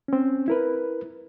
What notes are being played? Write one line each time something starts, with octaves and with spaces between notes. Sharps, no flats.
C4 C#4
E4 A#4 B4